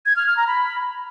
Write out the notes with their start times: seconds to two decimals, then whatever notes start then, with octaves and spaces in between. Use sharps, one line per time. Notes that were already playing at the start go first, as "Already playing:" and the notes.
0.06 G#6
0.16 F6
0.27 F6
0.37 A#5
0.47 B5